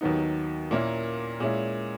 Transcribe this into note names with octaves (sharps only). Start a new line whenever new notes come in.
D#2 D#3 F#3 B3 D#4
A#2 A#3 C#4 E4
A#2 G#3 C#4 E4